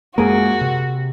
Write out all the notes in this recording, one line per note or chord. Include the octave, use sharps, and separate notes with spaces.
F#2 G#3 A#3 F#4 G#4 A#4
C3